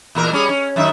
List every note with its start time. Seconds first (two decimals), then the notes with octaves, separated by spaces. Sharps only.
0.15 E2 A#2 A#4
0.32 G3 C#4 G#4
0.49 C#4
0.76 F#2 D#3 E5